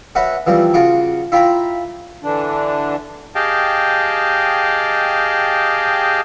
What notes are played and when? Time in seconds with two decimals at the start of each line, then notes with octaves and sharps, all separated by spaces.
0.15 C#4 F#4 B4 E5 F#5
0.47 E3 F3 G3 C4
0.74 C#3 F4 F#4 D6
1.32 E4 F4 C5 G5 A#5 B5
2.23 D3 E3 D4
3.35 G4 G#4 D#5 F5 G5 A5